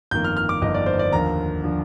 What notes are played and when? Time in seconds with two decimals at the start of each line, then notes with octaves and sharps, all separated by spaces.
0.11 G1 F2 D#3 A#3 G6
0.24 F6
0.37 F6
0.49 D6
0.62 G1 F2 D#3 A#3 D#5
0.74 D5
0.86 C5
0.99 D5
1.12 D#2 D3 F3 A#5
1.63 D3 F3